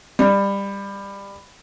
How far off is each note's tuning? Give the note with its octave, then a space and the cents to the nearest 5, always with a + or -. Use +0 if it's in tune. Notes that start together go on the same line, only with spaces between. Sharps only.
G3 +20